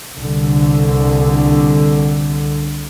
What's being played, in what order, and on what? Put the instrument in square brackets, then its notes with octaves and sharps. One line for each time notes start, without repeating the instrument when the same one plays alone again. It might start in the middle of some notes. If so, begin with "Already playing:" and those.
[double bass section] C2 D3